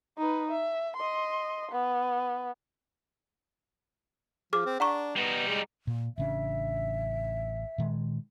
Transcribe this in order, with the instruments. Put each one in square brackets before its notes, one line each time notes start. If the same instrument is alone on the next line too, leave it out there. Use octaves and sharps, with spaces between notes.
[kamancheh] D#4 B4
E5
D#5 C6
B3
[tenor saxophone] F3 [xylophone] G#4 D6 F6
[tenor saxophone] C4
[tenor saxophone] D4 [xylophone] F#5 A#5 C#6
[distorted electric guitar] G3 D#4 [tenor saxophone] B3
[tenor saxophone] G#3
[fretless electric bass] A#2
[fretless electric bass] A1 C#3 D4 [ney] E5
[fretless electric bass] A#2 D#3 G#3